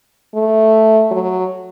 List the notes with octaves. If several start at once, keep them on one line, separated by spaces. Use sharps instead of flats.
A3
F#3